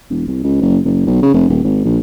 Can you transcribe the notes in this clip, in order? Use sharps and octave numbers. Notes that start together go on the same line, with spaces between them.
E1
C2
C#2
F#1
F#1
B1
C#3
F1
D#1
G#1
A#1